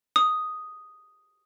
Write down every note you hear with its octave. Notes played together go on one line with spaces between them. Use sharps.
D#6